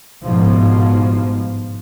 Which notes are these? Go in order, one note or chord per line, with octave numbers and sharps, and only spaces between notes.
G1 G#2 B2 F3